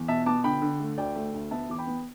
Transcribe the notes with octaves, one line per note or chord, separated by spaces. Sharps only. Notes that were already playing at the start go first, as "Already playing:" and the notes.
Already playing: E2
B2 E5 A5
B3 A5 D6
D3 G5 B5
D3
A3
D2 D5 G5
A3
D2
B3 E5 A5
E2 D6
G5 B5
B3